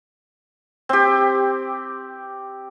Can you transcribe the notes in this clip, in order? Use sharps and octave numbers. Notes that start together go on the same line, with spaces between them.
C4 G4